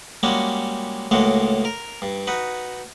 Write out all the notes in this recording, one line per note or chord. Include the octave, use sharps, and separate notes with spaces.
G3 G#3 A#3 C#4 F#4
C#2 A2 G#3 A#3 F#4
A#4
G2
D#4 F#4 B4